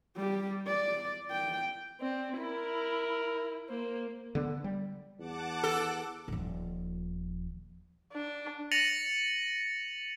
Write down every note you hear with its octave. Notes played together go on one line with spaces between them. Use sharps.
G3 G4
D5
G5
C4 D5
E4 A#4
A#3 C5
D3 B3
G3
E2 F#5 A5 D6
A4
D#1 F3
D4
A6 A#6 C#7 D#7 F7 F#7